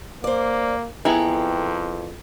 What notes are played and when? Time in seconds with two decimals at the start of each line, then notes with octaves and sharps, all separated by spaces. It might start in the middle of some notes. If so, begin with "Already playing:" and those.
0.24 A#3 C5 D5
1.05 F2 B3 E4 G#4 A4 G5 A#5